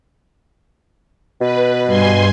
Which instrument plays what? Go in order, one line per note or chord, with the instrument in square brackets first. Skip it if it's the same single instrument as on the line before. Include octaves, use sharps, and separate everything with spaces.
[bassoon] B2 [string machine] B4
[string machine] G2 G#5 C6